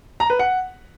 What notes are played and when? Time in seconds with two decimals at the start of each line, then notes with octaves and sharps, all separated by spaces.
0.20 A#5
0.30 B4
0.39 F#5